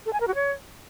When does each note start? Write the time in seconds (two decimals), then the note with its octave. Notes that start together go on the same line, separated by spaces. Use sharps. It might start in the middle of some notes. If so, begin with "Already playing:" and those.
0.06 A4
0.13 G#5
0.20 A#4
0.27 F#4
0.35 C#5